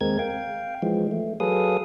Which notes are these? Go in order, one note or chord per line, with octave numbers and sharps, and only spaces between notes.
D#2 G#3 C4 A#4 G#6
F5 G5
E3 F3 G#3
A3
F#3 G#4 A4 B4 F5 D#6